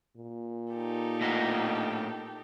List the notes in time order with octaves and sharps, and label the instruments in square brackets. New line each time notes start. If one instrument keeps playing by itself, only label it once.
[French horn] A#2
[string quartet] D#4 G4 A4
[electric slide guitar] A2 D#5 F#5